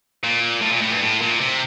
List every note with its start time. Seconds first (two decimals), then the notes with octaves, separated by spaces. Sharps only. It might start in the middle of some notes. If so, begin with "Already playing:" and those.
0.24 A#2
0.62 A2
0.72 A#2
0.82 A2
0.91 G2
1.01 A2
1.21 A#2
1.41 C3